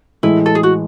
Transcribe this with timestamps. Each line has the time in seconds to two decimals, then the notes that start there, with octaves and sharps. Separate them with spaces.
0.23 A2 E3 G#3 E4
0.46 A4
0.55 G#4
0.63 F#4